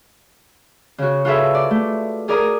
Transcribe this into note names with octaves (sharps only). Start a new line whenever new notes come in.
C#3 F#4
F4 F#4 G#4 A4 B4 E5
D5
A3
G#4 A#4 D5 A#5 D#6